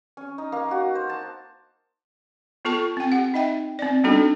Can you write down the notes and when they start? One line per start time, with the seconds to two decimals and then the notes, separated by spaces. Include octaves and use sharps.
0.17 C#4
0.38 D#4
0.52 A#3
0.71 F#4
0.95 C5
1.09 A5
2.65 B3 F4 A4 A5 C#6
2.97 C4 G5
3.12 G4 F#5
3.34 D#4 D#5 E5 G5
3.79 C4 D5
4.04 G3 B3 D4 D#4 F#4 A4